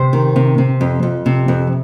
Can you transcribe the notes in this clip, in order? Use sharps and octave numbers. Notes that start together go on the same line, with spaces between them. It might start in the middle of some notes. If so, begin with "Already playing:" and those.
Already playing: C3 C5
D#3
C3
C3
F2
F2
C3
F2